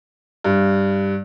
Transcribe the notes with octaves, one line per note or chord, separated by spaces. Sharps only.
G2